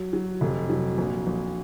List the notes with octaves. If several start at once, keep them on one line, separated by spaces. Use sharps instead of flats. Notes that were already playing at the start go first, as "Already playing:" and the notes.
Already playing: F#3
F#3
F1
F#3
A#1
A#1